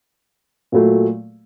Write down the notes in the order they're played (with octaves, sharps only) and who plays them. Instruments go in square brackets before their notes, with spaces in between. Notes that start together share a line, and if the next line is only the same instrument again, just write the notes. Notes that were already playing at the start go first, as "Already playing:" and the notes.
[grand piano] A#2 F#3 A3